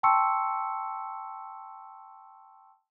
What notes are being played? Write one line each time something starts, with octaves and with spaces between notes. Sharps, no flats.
G5 A5 C6 C#6 E6 C#7